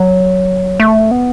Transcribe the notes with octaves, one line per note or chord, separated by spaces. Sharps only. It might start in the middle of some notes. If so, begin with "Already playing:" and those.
Already playing: F#3
A3
B3